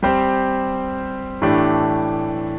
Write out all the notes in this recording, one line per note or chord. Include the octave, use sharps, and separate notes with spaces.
G3 C4 G4 C5
A2 E3 A3 D4 G4